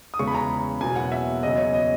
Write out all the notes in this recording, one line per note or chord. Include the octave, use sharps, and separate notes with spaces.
D#6
E2 C#3 G#3 C#6
B5
A#5
E2 B2 F#3 A#3 G#5
F#5
E5
E2 C#3 F#3 D#5
C#5
D#5